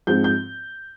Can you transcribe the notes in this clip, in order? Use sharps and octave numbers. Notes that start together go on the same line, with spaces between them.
G#2 F3 G#3 C4 G6
G6